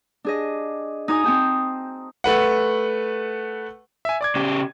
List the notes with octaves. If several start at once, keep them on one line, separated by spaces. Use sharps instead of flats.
D4 G#4 D#5
D#4 F#4 G#5 D#6
C4 D#4 G5 A5
A3 B4 F#5
E5 G#5
D5 D6 G#6
C#3 G4